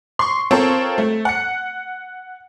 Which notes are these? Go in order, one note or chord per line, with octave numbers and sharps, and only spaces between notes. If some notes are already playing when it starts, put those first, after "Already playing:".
C6 C#6
C4 F4 A4 A#4 C5 C#5
A3
F#5 C#7